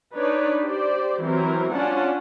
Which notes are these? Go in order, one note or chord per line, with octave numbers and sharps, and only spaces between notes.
D4 D#4 B4 C#5 D5
G4 C5 D5
E3 F#3 C4 A#4
C#4 D4 F4 D5 F#5 A5